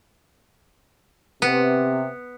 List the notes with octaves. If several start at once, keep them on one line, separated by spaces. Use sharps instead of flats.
C3 B3